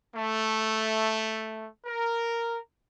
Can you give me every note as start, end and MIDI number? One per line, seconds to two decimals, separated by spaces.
0.15 1.67 57
1.86 2.57 70